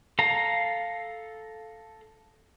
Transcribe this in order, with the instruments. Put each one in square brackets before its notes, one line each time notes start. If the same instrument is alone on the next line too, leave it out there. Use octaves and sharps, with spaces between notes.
[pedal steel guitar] A4 F5 A#5